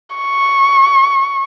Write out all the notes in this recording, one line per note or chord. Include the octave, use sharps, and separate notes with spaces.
C#6